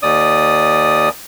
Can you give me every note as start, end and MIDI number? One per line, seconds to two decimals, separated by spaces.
0.03 1.09 39
0.03 1.09 74
0.03 1.09 87